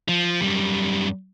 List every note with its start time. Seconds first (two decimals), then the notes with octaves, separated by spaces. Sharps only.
0.08 F3
0.42 F#2 G3